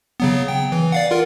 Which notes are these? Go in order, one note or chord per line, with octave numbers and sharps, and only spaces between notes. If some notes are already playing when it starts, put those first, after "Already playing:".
C#3 F#3 B3
G5
E3
D5 F5 F#5
F4 A#4